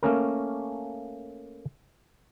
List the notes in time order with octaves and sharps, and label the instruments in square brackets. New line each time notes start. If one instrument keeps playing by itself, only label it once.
[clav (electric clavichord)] A3 A#3 C#4 A#4